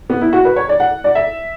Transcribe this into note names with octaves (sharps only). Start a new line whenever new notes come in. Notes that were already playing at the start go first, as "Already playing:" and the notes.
B3
E4
F#4
B4
C#5
D5
F#5
D5
E5